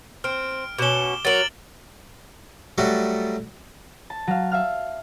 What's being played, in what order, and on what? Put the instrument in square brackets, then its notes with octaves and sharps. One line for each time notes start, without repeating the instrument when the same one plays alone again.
[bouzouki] C4 [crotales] F6 D7
[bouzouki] B2 C#4 [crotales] D6 E7 G7
[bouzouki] F#3 A#4 [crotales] A6 D7 F#7
[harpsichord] F#3 G3 A3 F#4
[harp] A5
F#3 F5
E5 F5 F6